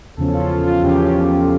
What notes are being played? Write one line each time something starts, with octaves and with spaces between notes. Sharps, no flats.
E2 C#3 F3 C#4 A4
F4
F4
F4
E2 C#3 F3 C#4 G4